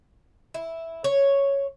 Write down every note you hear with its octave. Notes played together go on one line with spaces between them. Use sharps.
E4
C#5